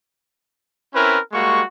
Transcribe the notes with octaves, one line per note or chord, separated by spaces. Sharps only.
C4 C#4 E4 A#4 B4
G3 G#3 A#3 F#4 C#6